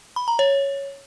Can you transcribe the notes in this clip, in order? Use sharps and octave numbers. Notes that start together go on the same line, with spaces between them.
B5
A#5
C#5